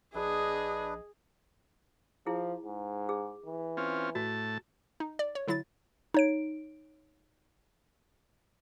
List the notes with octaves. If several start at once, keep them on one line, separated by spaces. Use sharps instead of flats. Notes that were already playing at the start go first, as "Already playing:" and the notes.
A#1 D4 G#4 B4 D#5
F3 E4 G#4
G#2
G#4
E3
C4 C#4 F4
A2 F#4 A5
D#4
D5
C#5
D3 F#3 E4 A6
D#4 C#5 D7